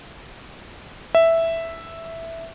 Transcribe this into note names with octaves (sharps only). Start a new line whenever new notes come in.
E5